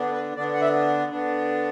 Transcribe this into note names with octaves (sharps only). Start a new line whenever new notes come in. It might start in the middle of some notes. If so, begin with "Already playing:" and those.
Already playing: D3 B3 D4
B4
D3 B3 D4 D5
F#5
E5
D3 B3 D4